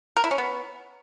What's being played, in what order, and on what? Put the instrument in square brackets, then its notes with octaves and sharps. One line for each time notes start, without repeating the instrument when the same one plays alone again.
[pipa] A#4
E4
C#4
B3